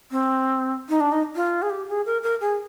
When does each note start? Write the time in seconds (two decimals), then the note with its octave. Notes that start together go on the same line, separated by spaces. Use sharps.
0.11 C4
0.89 D#4
1.01 D4
1.12 D#4
1.36 F4
1.62 G#4
1.70 G4
1.89 G#4
2.06 A#4
2.23 A#4
2.41 G#4